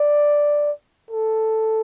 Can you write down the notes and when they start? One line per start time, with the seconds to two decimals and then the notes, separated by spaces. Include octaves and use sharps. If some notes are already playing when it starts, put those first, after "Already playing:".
Already playing: D5
1.11 A4